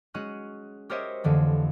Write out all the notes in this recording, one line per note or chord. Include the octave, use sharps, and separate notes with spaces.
G#3 C#4 F#4 F#6 D#7
G4 A#4 C5 C#5 D#5 E5
F2 D3 E3 A3